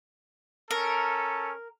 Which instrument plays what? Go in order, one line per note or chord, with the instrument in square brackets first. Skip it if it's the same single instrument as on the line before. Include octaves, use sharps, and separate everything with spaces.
[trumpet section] C#4 A4 [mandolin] A#4